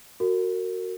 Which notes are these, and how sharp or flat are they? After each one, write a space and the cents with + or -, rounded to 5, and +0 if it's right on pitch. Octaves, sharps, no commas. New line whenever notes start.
F#4 +0 A#4 -30